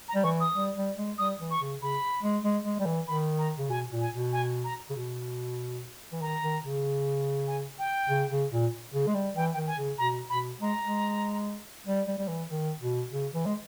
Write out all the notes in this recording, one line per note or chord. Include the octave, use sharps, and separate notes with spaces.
A#5
G3
E3 C#6
D#6
G3
G3
G#3
G3 D#6
E3
C#6
C#3
C#3 B5
G#3
G#3
G#3
G3
E3
D#3 B5
A#5
C#3
B2 G#5
A#2
G#5
B2
G#5
A#5
C#3
B2
E3
D#3 A#5
D#3
C#3
G#5
G5
C#3
C#3
A#2
C#3
G#3
G3
E3 G5
G5
D#3
G#5
C#3
B2 A#5
B2 B5
G#3 A#5
G#3
G3
G3
G3
E3
D#3
B2
C#3
E3
G#3